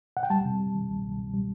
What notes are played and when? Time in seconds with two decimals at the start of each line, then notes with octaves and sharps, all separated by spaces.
0.17 F#5
0.23 G5
0.30 G3 A5
0.45 C3
0.60 G3
0.74 D#3
0.89 C2
1.04 C2
1.18 C3
1.33 G3